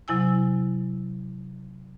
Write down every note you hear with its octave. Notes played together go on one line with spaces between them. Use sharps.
C3 F#3 E4 G#5 E6